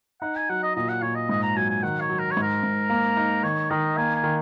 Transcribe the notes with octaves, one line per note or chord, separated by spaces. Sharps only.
D#4 F#5
G#5
F#3 F#5
D#5
A#2 D#5
F#5
A#2 C#5
D#5
G#2 D#5
A#5
F#3 G#5
G#5
D#3 F#5
C#5
F#3
A#4
C#5
G#2
A#4
G#2
A#3
D#4
D#3 C#5
D#3 D#5
A#3 G#5
G#5
D#3